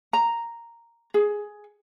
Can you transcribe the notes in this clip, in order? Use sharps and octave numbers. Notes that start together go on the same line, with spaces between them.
A#5
G#4